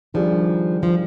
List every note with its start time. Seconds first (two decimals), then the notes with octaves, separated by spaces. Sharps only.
0.14 D#3 F3 G3 D4 G#4
0.83 F3